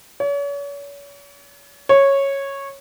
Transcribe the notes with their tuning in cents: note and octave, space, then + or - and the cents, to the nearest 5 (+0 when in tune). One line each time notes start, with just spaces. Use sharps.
C#5 +40
C#5 -10